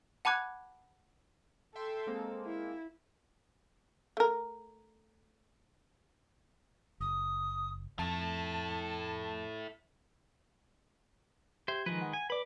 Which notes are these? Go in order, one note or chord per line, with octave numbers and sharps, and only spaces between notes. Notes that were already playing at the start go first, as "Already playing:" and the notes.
F#5 A5 B5 D6 F#6 G#6
A4 E5 G5 C6
G#3 A#3 C4
E4
A3 A#4
F#1 D#6
F2 E4 A4 A5
G4 C5 E5 G#6
D#3 F3 G#3 B4
F#5
G#5
B4 D5 B5 D6